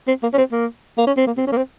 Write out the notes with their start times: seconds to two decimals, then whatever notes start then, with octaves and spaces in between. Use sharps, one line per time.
0.08 C4
0.23 A#3
0.33 C#4
0.38 C4
0.52 A#3
0.98 A#3
1.07 C#4
1.17 C4
1.27 A#3
1.37 C4
1.47 C#4
1.52 A#3
1.57 C4